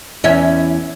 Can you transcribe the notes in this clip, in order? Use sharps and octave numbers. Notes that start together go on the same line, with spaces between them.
E2 C#4 E5